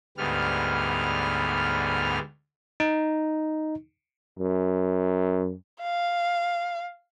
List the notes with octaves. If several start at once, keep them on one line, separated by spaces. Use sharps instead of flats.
D2 G#2 G3 B3 F6
D#4
F#2
F5